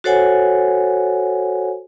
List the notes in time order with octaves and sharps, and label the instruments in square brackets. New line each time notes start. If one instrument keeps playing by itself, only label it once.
[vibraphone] F#4 A4 C5 C#5 F#5 G#5